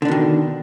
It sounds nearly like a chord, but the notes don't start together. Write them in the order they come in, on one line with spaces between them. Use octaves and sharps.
D3 D4 B2 D#3